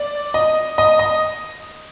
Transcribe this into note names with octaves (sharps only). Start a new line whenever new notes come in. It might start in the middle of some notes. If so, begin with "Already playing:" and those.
Already playing: D5
D#5
D#5
D#5